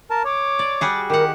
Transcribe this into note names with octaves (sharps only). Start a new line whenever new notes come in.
A#4 A5
C#5 D6
D5
G3 F#4 G#4
D#3 G4 A#4 F#5